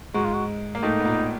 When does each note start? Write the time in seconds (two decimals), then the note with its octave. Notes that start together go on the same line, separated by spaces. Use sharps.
0.14 G#2 G#3 F#4
0.25 F4
0.34 F#4
0.75 A#3
0.83 A2 A3 D#4
1.00 B3
1.05 A#2 A#3